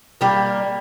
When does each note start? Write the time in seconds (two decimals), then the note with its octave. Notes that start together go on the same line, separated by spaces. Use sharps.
0.21 G3 A#3